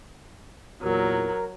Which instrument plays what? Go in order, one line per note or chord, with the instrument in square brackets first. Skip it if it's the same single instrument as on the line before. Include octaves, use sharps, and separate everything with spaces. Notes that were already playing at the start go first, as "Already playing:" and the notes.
[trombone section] E2 A#2 [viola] F#3 [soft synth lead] A#4